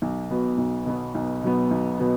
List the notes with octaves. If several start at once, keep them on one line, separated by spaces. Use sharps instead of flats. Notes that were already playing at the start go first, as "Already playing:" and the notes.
B1
B2 F#3 B3
B1
B2 F#3 B3
B1
B2 F#3 B3
B1
B2 F#3 B3